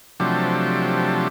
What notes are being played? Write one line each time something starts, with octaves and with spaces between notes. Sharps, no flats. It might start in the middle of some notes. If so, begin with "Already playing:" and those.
C3 F3 F#3 A3 D4 G4